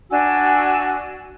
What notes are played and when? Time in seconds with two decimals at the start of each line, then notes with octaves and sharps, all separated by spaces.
0.11 D4 F#4 G#5 E6